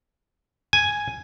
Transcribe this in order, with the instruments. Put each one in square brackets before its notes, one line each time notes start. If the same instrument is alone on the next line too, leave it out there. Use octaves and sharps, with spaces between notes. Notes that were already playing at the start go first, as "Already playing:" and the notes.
[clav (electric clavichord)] G#5